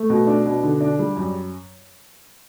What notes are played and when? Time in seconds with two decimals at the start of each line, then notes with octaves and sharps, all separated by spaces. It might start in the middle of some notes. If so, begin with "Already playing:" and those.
Already playing: A3
0.10 B2
0.27 D4
0.45 B2
0.63 D3
0.81 D4
0.99 G3
1.16 F#2